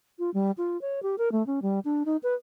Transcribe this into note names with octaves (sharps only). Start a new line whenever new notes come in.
F4
G3
F4
C#5
G4
A#4
A3
C#4
G3
D4
D#4
B4